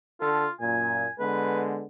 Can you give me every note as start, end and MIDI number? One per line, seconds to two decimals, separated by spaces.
0.21 0.45 50
0.21 0.51 65
0.21 0.45 69
0.61 1.07 42
0.61 1.07 46
0.61 1.13 80
1.19 1.86 50
1.19 1.86 56
1.19 1.86 59
1.19 1.62 71